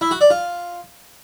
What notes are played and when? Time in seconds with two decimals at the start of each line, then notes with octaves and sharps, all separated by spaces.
0.01 E4
0.11 F#4
0.21 D5
0.30 F4